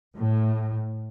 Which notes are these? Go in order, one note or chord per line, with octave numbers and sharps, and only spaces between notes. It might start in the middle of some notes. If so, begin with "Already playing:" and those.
A2